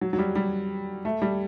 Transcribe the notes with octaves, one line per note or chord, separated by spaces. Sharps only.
F#3
F#3
G3
G3
A3
G3